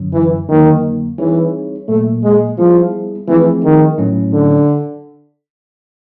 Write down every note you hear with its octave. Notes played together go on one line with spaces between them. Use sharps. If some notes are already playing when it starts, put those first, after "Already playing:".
Already playing: F#2 D3 F#3
E3
F2 D3 D#3 F#3 A#3
E3 G3 C4 D#4 G#4 C#5
A#2 F#3 A3 A#3
G#3
F3 G3 B3 E4 G#4
E3 F3 A3 C4 E4 G#4
D#3
A2 F#3 A3 C#4 E4
D3